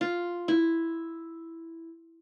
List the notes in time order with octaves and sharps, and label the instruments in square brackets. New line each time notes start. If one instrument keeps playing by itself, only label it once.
[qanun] F4
E4